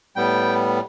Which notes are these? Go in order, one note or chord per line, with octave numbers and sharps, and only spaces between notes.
A2 G3 B3 G5